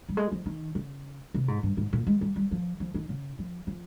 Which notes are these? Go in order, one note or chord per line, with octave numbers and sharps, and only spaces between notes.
G3
G#3
F3
D#3
C#3
C3
G#2
G2
G#2
A#2
G#3
G3
G3
F3
F3
D#3
C#3
F3
F3